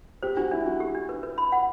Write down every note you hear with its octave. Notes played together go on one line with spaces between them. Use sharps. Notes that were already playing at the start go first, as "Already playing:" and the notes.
G4 C5
D4 F#4
D4 E4
D4 F#4
G4
D4
B4
B4
B5
F#5